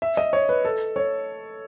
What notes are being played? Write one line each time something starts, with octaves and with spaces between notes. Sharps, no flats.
E5
D#5
C#5
B4
A4
C#5